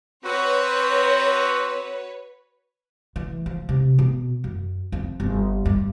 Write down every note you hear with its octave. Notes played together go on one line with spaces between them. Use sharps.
C4 F#4 B4 C#5
E3
F3
C3
B2
F#2
F2
G1
G2